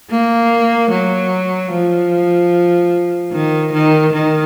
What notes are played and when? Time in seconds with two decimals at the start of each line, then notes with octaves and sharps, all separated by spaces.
0.10 A#3
0.90 F#3
1.72 F3
3.32 D#3
3.73 D#3
4.13 D#3